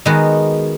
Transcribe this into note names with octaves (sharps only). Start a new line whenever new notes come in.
D#3 G#3 B3 F#4